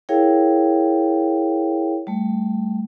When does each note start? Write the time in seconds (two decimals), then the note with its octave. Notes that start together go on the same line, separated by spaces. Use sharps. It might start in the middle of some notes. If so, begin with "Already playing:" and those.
0.09 E4 G#4 A#4 C#5 F5 G5
2.07 G3 A3